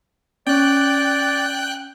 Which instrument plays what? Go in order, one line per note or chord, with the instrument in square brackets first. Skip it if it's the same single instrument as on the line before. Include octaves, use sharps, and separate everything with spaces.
[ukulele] C#4 [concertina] D5 [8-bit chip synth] G5 F#6